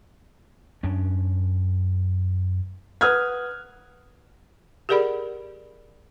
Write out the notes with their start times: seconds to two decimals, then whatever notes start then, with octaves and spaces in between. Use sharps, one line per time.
0.83 F#2 C#4 D4
3.01 B4 F#5 D#6 F6 F#6 G#6
4.89 G4 G#4 A#4 D5 F#5 B5